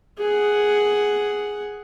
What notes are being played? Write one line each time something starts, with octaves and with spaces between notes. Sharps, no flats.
G#4 F#5